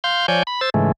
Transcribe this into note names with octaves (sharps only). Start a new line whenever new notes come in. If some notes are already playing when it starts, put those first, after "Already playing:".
F5 C6 G6
F3 C#5 D5 G#5 G6
B5
C5 E6 A6
G#2 C#3 E3 G#3 A3